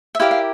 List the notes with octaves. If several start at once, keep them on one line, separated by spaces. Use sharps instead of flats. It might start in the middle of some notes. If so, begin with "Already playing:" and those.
E5
E4 G4 A#4 D5 F5
F5